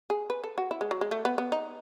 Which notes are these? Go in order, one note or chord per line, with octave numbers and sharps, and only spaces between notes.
G#4
B4
A4
F#4
E4
G#3
F#3
G#3
A3
B3
B3
D#4